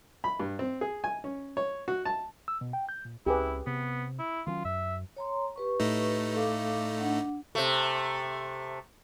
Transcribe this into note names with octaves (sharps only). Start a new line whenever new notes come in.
B5
G2
C4
G#4
G#5
C#4
C#5
F#4
A5
E6
B2
G5
G6
A#2
C#2 C#4 E4 G4 G#4 B4
C3 B3
E4
D#3 F#3 C#4 F4
F#2 E5
C#5 A#5 C6
G4 B4 C#6
A2 A3 D#4
A4 F5 D6
D4 F#5
C3 A3